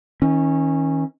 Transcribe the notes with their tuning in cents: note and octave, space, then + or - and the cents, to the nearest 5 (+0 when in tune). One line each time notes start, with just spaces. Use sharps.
D#3 +35 C#4 -20